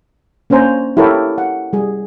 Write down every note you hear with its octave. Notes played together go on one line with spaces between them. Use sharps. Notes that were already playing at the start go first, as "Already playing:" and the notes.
A#3 C#4 D4 C5 G#5 A#5
E4 G4 A4 A#4 C#5 G5
F#5
G3 G#4